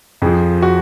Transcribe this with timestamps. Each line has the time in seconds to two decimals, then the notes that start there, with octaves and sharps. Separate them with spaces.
0.22 F2 F3 G#4
0.62 F#4